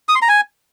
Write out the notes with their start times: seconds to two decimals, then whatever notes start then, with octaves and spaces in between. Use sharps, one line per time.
0.09 D#6
0.15 C6
0.22 A#5
0.29 G#5